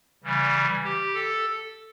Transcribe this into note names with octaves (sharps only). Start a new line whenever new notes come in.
C#3 E3 G3
G4
A4